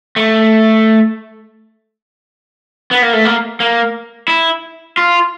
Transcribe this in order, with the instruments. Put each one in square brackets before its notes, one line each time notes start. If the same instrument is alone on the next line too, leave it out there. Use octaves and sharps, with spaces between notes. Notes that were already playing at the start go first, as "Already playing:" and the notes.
[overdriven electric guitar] A3
B3
A#3
A3
A#3
A#3
E4
F4